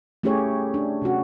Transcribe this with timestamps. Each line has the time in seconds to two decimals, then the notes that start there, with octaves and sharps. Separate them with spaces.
0.23 A3 C#4 E4 G4 G#4 C#5
0.74 D4
1.02 C3 C#4 F#4